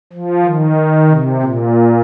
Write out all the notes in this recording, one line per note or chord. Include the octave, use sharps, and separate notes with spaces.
F3
D#3
C3
A#2